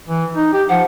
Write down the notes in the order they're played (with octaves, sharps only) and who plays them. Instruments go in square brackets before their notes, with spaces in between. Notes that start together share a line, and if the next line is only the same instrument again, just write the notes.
[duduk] E3
D#4
G4
[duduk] F3 [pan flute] F#5